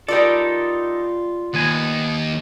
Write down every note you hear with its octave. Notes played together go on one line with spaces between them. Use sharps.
G3 D#4 F4 A4 A#4 D5
D#2 B3 G#5